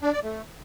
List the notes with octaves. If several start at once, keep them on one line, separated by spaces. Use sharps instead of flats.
D4
D5
A3